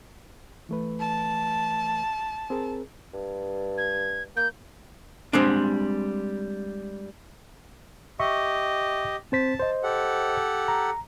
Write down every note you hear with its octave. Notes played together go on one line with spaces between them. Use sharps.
E3 A3 B4
A5
C4 G#4 A#4
G2
G#6
A#3 G6
G3 G#3 C4 D4
G4 D#5 E5 C#6
C4 C5 A5 B6
C5 D#5
G4 A4 F#5
A#5